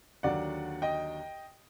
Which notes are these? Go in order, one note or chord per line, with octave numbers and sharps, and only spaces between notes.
D#2 D3 F#3 D5 F#5
D#5 G5